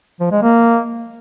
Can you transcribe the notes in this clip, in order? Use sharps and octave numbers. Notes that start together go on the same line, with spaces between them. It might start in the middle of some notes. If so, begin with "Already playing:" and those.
F3
G#3
A#3